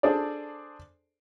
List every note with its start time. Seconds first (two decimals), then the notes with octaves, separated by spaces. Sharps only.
0.03 D4 G#4 A4 C5 D5